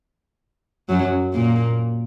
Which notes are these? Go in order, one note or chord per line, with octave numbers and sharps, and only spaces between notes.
F#2 F#3
A#2 A#3